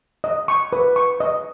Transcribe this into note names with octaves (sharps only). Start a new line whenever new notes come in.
D#5
C#6
B4
C#6
D#5